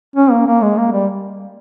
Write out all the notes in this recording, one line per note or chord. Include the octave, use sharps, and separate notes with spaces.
C#4
A#3
A#3
G#3
A#3
G3